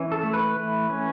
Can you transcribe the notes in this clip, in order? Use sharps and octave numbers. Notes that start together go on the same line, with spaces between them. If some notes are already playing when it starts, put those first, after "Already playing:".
Already playing: E3 C#4
A4
A3
B4
E3 B4
C#4